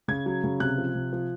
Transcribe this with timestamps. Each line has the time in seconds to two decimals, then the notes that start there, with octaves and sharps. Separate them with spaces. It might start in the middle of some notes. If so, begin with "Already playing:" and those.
0.08 C#3 G#6
0.26 F#3
0.44 C#3
0.60 C3 F#6
0.78 F3
0.95 C3
1.13 F3